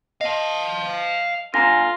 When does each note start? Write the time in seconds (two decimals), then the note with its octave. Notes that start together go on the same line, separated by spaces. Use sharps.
0.21 D#5 F5 A5
1.54 D3 F4 G#5 A#5 A#6